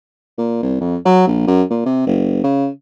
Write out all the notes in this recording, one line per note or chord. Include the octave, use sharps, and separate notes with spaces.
A#2
C2
F2
F#3
A#1
F#2
A#2
C3
F#1
C#3